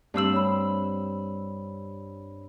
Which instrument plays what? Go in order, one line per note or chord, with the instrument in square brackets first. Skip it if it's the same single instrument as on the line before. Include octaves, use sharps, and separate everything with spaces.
[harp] G2 C4 E6 [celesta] D4 C7 F#7
[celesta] C#5 B5